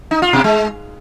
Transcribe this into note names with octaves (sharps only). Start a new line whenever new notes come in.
D#4
F4
B2
G#3